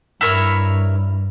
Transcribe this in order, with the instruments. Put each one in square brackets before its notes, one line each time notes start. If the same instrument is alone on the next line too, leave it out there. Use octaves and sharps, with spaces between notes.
[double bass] G2 [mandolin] E4 A#4 C#5